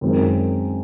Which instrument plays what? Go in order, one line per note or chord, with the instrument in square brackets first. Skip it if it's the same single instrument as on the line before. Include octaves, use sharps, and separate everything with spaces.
[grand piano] F#2 D#3 G#3 C4 F#4